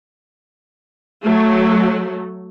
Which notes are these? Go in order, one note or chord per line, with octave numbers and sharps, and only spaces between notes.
F#3 A3